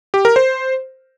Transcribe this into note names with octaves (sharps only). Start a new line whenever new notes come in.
G4
A#4
C5